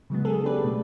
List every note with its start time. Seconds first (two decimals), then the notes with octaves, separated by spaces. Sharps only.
0.10 C#3 F#3 G#3 B3
0.25 G#4 A4
0.43 D4 G4 G#4 B4 D5
0.63 B2 A3